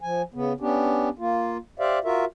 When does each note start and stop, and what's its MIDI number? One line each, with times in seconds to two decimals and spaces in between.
0.01 0.22 53
0.01 0.22 80
0.34 0.53 49
0.34 0.53 59
0.60 1.09 59
0.60 1.09 61
0.60 1.09 62
0.60 1.09 67
1.19 1.57 58
1.19 1.57 65
1.79 1.99 67
1.79 1.99 72
1.79 1.99 74
1.79 1.99 76
1.79 1.99 77
2.04 2.25 65
2.04 2.25 66
2.04 2.25 70
2.04 2.25 76